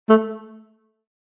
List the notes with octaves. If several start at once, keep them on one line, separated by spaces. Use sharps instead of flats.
A3